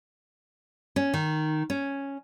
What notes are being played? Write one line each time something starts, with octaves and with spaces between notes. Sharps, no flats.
C#4
D#3
C#4